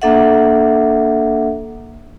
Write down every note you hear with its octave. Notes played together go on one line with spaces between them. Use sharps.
A#3 D4 A4 E5 F#5